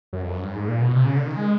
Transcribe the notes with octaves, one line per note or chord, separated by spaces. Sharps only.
F#2
F2
F#2
G2
G#2
A#2
B2
C3
C#3
D3
D#3
G#3